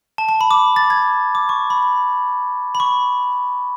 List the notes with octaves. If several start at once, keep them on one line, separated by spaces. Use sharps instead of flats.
A5
A5
B5
D6
A6
G#6
D6
C#6
B5
B5
C#6